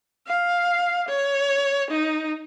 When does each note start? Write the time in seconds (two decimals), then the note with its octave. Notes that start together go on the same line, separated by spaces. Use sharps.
0.27 F5
1.09 C#5
1.90 D#4